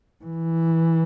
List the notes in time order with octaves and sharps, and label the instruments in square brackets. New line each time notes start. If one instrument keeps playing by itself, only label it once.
[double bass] E3